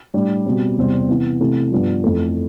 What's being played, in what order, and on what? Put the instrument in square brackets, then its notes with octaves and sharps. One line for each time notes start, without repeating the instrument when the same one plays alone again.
[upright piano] A2 G3 D4
B2 G3 C4
E2 C3 G3 C4
C3 E3 B3
C3 E3 A3
G2 F3 B3 D4
F2 E3 A3